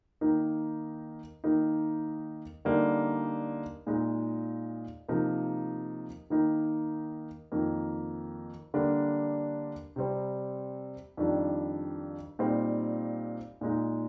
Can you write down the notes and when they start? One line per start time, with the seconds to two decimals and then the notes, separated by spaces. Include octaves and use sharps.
0.21 D#3 A#3 D#4
1.44 D#3 A#3 D#4
2.65 D3 G3 A#3 D#4
3.87 A#2 G#3 D#4
5.08 C3 F3 A#3 D#4
6.30 D#3 A#3 D#4
7.52 F2 D#3 A#3
8.74 D3 G3 A#3 D4
9.96 C3 G3 C4
11.17 F2 D#3 G3 D4
12.39 A#2 G3 C4 D#4
13.61 A#2 G#3 D#4